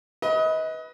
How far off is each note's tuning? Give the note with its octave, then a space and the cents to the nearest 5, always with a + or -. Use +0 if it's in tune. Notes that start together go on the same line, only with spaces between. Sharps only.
B4 +0 D#5 +30